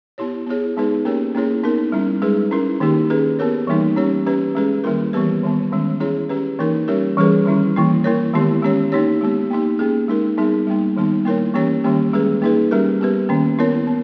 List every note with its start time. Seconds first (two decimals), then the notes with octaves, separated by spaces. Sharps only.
0.18 B3 E4 G4 C#5
0.47 B3 E4 G#4 C#5
0.77 G#3 B3 D#4 G#4 B4
1.05 A#3 C#4 G4 A#4 C#5
1.35 A#3 C#4 E4 G#4 C#5
1.63 B3 D#4 A#4
1.92 G3 C#4 E4
2.22 G#3 D#4 G#4 B4
2.51 C#4 E4 A#4
2.80 D#3 A#3 D#4 G4
3.10 C#4 G#4 B4
3.39 B3 G4 A#4 C#5
3.67 E3 G3 A#3 D#4
3.96 C#4 G4 C#5
4.26 C#4 G4 B4
4.55 G#3 C#4 G#4 B4
4.84 D#3 G3 A#3 E4 A#4
5.13 E3 G3 B3 G4 B4
5.43 D#3 G3 B3
5.72 D#3 G#3 C#4
6.00 C#4 E4 G#4 C#5
6.29 C#4 G4 B4
6.59 E3 A#3 D#4 A#4
6.88 G3 C#4 G4 A#4 C#5
7.17 E3 G3 C#4 G#4 B4
7.46 D#3 G3 C#4 E4
7.76 E3 A#3 E4
8.04 A#3 E4 A#4 C#5
8.34 D#3 G#3 B3 E4 G4
8.63 G#3 C#4 G4 C#5
8.92 A#3 D#4 G4 C#5
9.21 G#3 B3 G4
9.51 A#3 D#4 G4
9.79 A#3 C#4 G#4
10.08 G#3 D#4 A#4
10.38 G3 B3 D#4 G#4
10.67 G3 A#3 D#4
10.96 D#3 G3 B3 D#4
11.25 A#3 E4 A#4 C#5
11.54 E3 A#3 C#4 G4 C#5
11.84 D#3 G3 A#3 C#4 G4
12.13 G#3 C#4 G#4 B4
12.42 A#3 D#4 G#4 B4
12.71 G3 C#4 G4 A#4
13.01 B3 G4 B4
13.29 D#3 A#3 C#4
13.59 B3 E4 A#4 C#5
13.87 B3